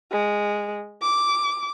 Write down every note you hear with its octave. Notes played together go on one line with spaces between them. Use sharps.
G#3
D6